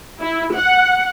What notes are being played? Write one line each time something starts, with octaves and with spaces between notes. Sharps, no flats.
E4
F#5